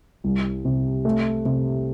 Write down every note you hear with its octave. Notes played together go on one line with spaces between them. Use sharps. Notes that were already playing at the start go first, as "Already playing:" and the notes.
C2
C3
A3
C3